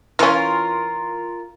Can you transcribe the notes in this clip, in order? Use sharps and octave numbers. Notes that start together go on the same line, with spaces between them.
E3 C#4 F4 A#4